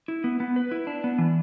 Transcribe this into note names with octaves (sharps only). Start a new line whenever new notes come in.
E4
B3
B3
B4
E4
D4
B3
E3